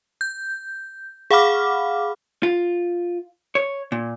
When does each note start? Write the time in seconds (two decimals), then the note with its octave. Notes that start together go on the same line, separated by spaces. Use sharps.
0.21 G6
1.31 G#4 F5 F#5 B5 D6 F6
2.43 F4
3.55 C#5
3.92 A#2